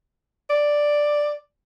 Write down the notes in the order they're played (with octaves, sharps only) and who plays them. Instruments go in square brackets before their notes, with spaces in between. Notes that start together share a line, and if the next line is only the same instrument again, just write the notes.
[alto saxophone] D5